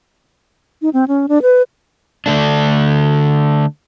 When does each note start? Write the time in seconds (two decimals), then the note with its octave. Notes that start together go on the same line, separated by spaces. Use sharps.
0.82 D#4
0.93 C4
1.08 C#4
1.29 D4
1.42 B4
2.26 D3 A3 D4